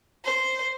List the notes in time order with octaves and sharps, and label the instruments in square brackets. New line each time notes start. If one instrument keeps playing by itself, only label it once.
[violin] C5